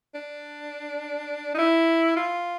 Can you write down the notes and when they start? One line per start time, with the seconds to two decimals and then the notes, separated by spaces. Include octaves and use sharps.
0.14 D4
1.54 D#4
1.58 E4
2.16 F4